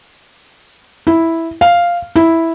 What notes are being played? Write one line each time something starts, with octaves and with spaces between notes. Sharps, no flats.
E4
F5
E4